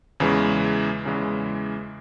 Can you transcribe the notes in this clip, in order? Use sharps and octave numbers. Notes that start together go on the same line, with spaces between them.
E2 C#3 E3 G#3
E2 C#3 E3 G#3